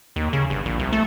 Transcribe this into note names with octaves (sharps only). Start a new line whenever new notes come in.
D#2
C#3
G1
A#1
C2
A3